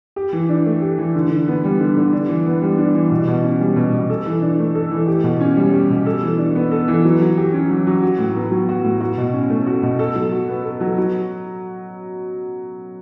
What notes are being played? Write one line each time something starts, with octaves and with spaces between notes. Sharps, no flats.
G4
E3
D4
A3
G4
E3
D3
D3
B3
G3
D3
D3
D4
E3
B3
G3
D4
E3
B2
B2
C#4
G3
B2
B2
A4
E3
D4
A3
A4
E3
G4
B2
C#4
G3
G4
B2
A4
E3
D4
B3
A4
E3
F#3
F#3
G4
C#4
F#3
F#3
F#4
A2
B3
F#3
F#4
A2
F#4
B2
C#4
A3
F#4
B2
A4
F#3
F#4
B3
A4
F#3
F#3